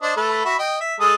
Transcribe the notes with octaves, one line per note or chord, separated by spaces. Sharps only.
D4 C5 D#5
A3 A4 B4
F#4 E5 B5
D#5 G5
E5
G#3 A4 D#6